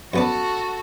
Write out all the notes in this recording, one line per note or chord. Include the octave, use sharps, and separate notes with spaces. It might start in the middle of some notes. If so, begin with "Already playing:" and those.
F#2 B3 F#4 A4 D5